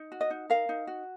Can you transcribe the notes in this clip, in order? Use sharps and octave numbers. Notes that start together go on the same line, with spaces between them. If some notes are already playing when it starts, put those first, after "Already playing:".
Already playing: D#4
F#4
D#5
D#4
A#4 F5
D#4
F#4